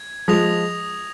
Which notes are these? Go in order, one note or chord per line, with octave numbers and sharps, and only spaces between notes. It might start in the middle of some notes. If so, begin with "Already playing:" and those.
Already playing: G#6
F3 G#3 D#6 A#6 F7